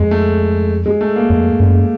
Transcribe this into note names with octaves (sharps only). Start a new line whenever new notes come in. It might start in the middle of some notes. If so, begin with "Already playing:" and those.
Already playing: F2 G#3
A3
G#3
A3
A#3
F2
F#2